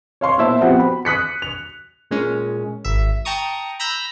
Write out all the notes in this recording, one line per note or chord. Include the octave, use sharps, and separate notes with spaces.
C#5 F5 C6 C#6
A#2 B3 E4 C5 E5 A5
F3 B3 C4 F#4 G4
B5
D#6 F#6 B6 C#7
F7
A#2 G#3 C#4
G#1 E5
G5 A5 A#5 C#6 D#6
A#5 B5 E6 G6 A#6